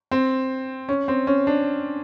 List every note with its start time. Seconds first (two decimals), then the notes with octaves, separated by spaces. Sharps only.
0.11 C4
0.89 C#4
1.08 C4
1.27 C#4
1.47 D4